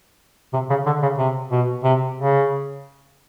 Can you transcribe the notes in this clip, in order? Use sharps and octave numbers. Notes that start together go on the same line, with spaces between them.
C3
C#3
D3
C#3
C3
B2
C3
C#3